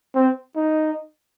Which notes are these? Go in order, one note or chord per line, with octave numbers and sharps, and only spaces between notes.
C4
D#4